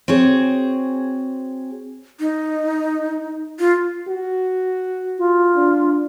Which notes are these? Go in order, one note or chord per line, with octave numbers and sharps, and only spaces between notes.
C4 F#4 G#4 C#5
D#4
F4
F#4
F4
D4